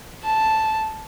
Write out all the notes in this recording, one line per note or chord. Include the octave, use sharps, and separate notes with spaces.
A5